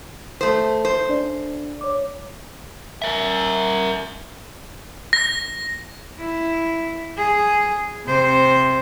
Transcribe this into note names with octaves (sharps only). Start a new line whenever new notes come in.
A3 C5
C5
D4 D5
C#5 D6
A#4 E5
A#6
E4
G#4
C3 C5